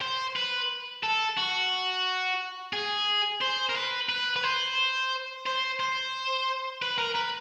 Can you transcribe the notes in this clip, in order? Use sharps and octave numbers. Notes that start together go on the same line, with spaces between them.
C5
B4
A4
F#4
G#4
C5
A#4
B4
B4
B4
C5
C5
C5
B4
A#4
B4